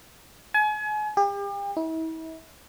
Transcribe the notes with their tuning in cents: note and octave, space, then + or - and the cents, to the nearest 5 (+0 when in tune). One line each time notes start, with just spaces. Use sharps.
G#5 +35
G4 +40
E4 -40